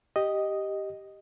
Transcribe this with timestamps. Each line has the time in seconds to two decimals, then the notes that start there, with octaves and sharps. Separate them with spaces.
0.16 G4 D#5